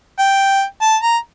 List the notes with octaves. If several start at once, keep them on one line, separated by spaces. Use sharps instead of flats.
G5
A5
A#5